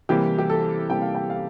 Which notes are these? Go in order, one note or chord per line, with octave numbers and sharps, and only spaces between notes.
C3 E3 G3 A#3 G4
G4
A4
C3 E3 G3 A#3 G5
F5
G5
F5